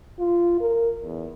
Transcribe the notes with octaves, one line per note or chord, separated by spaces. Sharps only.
F4
A#4
E2